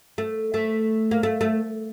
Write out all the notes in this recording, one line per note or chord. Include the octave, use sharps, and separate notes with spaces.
A3
A3
A#3
A3
A3